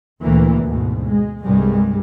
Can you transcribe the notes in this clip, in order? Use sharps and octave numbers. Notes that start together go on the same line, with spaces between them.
D2 A#2 E3 A#3
D2 G#2 B2
G#3
C2 G2 G3 G#3